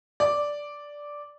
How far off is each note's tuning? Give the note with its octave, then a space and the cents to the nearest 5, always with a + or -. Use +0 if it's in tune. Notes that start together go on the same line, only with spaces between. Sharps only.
D5 -5